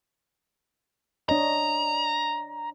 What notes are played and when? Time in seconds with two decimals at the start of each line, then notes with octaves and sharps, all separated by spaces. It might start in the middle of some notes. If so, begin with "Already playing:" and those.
1.29 D4 C#5 D#5 A#5